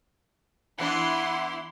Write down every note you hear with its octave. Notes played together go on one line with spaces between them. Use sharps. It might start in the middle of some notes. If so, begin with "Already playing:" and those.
E3 B3 D4 E4 F#5 C6